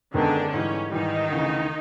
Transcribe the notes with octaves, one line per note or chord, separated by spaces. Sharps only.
F#2 D3 D#3 G#3 B3 D4
G#2 E3 G3 C#4
G#2 D#3 E3 G3 D#4
D2 C#3 E3